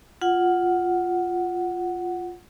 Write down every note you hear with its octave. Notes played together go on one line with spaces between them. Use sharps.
F4 F#5